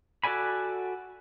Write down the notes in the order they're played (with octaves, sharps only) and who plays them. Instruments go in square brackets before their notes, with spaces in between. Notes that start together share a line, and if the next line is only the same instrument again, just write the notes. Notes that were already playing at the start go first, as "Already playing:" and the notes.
[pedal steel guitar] F#4 A4 D5 G#5 B5